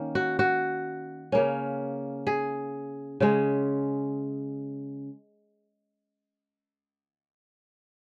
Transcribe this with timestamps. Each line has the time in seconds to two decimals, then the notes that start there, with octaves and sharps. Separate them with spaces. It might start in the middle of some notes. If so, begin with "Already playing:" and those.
Already playing: D#3 A#3 C#4
0.15 F#4
0.39 F#4
1.32 C#3 A#3 C#4
2.27 G#4
3.20 C#3 G#3 C#4